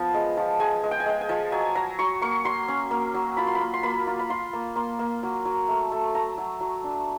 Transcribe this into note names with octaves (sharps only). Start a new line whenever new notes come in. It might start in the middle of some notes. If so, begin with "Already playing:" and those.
Already playing: F3 B3
G#3
F3
G#3 G#5
G#3
G5
G#5
G#3 G5
G#5
F3
F#3 G#5
F#3 A#5
F#3 C#6
A#3 C#6
F#3 C6
C#4
A#3
F#3
F4 B5
C6
B5
A#3
C6
A#3 B5
F4
B5
F4 C6
A#3
A#3 C6
A#3
F#3
F#3
A3
A3
A3 A#5
F#3
F#3
D4